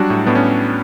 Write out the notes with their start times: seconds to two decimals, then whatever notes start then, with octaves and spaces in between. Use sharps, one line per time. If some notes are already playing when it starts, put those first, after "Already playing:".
Already playing: F#3 G3 D4 F#4
0.10 A2
0.26 A2 B3 D4
0.35 C#4